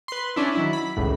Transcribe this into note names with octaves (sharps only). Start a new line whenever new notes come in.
B4 C6
C#4 D4 E4
D#3 F#3 E4
B5
G#1 C#2 A2